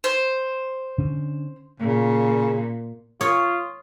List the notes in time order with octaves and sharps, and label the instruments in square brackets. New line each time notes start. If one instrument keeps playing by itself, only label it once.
[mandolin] C5
[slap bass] D3 C#4
[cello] A#2 [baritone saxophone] C#3
[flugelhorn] F4 [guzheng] C#5 [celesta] D#6